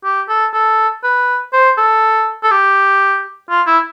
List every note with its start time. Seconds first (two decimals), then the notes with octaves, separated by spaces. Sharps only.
0.04 G4
0.29 A4
0.54 A4
1.04 B4
1.53 C5
1.78 A4
2.43 A4
2.51 G4
3.50 F4
3.67 E4